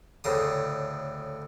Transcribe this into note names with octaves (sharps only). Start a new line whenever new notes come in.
D2 A2 C#3 D#6